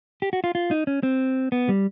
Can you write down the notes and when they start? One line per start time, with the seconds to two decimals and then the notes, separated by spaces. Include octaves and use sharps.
0.22 G4
0.33 F#4
0.44 F4
0.55 F4
0.71 D#4
0.87 C#4
1.03 C4
1.52 B3
1.69 G3